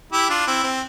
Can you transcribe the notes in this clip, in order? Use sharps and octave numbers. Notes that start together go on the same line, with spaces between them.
E4 G4
D4 F4
C4 E4
C4